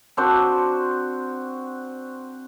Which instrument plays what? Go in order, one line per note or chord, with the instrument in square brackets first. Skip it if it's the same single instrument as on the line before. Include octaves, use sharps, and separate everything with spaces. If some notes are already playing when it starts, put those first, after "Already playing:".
[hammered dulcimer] C4 D4 F#4 C5